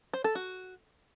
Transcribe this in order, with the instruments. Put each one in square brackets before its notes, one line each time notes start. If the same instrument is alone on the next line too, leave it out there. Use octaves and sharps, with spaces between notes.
[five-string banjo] C5
A4
F#4